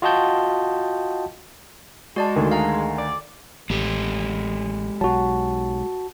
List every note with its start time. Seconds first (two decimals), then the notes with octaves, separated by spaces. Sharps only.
0.02 F4 F#4 D#5 G5 A5 G6
2.16 G#3 F#4 D5 A5
2.36 D2 D3 D#3
2.52 F5 A#5
2.98 D5
3.70 A1 G#3 G4 A4
5.01 B1 F#3 F#4 A5